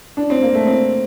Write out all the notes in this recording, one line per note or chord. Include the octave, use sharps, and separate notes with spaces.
D4
C4
A#3
A3
C4